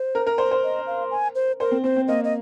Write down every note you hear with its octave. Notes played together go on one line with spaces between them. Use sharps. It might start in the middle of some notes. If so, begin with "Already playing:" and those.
Already playing: C5
A#4
A#4
C5
C5
D#5
F5
G#5
C5
A#4 C5
C4
C4 C5
C4
A#3 D#5
D#5